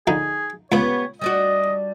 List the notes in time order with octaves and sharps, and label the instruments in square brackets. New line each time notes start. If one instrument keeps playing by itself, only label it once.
[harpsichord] A#1 D3 D#4 [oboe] G#4
[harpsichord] C#2 A#2 B5 [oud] B3 G4 [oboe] C#5
[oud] G3 D4 F#4 [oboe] D#5